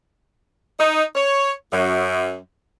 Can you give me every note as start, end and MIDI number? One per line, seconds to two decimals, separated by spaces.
0.79 1.03 63
1.15 1.52 73
1.73 2.38 42